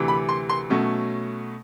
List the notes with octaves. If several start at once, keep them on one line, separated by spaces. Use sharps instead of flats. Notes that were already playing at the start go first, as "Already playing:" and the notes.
Already playing: D2 C3 E3
B5
C6
C6
B2 F#3 A3 C#4